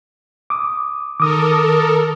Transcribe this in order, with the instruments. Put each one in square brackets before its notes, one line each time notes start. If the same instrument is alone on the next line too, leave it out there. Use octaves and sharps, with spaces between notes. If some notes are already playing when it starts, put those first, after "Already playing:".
[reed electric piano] D6 D#6
[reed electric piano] D#3 [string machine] A4 A#4 [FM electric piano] D6 D#6